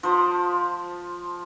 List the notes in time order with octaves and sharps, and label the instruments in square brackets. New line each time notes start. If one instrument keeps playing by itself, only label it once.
[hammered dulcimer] F3 C5